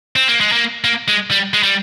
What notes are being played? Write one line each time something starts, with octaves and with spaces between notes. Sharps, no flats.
C4
A#3
G#3
A#3
A#3
G#3
G3
G#3
G3